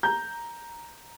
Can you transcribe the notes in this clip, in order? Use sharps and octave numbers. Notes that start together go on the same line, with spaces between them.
A#5 G6